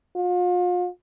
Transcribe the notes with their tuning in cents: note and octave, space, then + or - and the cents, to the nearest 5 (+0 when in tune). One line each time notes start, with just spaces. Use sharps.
F4 +40